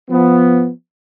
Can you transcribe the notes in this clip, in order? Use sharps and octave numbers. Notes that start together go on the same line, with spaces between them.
F3 B3